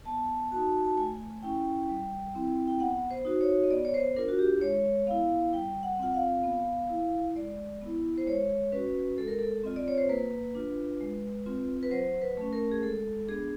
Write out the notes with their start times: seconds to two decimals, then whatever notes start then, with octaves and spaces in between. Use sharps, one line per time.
0.05 B3 A5
0.52 D#4 F#4 A5
0.85 A5
0.97 A3 G#5
1.43 C#4 E4 G5
1.89 G3
2.35 C4 E4
2.68 G5
2.80 B3 F#5
3.11 C5
3.25 D#4 F#4
3.41 C#5
3.64 D#5
3.71 B3 D5
3.85 C#5
3.94 C5
4.16 D4 F4 A#4
4.28 F#4
4.39 G4
4.61 G#3 C#5
5.07 B3 E4 F5
5.53 G3 G5
5.83 F#5
5.99 C4 F4 F#5
6.14 F5
6.44 B3
6.89 E4
7.35 G#3 D5
7.81 B3 E4
8.18 C5
8.27 G#3 C#5
8.72 C#4 F#4 B4
9.18 G#3 A4
9.28 A#4
9.39 A4
9.64 C4 F4 D#5
9.76 D5
9.88 C#5
9.98 C5
10.09 A#3 B4
10.55 D4 F4
11.00 G#3
11.46 C4 F4
11.83 B4
11.91 F#3 C5
12.22 B4
12.37 A3 C#4
12.53 A#4
12.71 G#4
12.82 G#3 A4
13.28 B3 D4 G#4